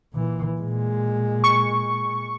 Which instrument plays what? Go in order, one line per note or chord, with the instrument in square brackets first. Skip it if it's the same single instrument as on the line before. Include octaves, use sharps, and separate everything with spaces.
[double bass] A#2 E3
A#2 G#3
[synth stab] C#6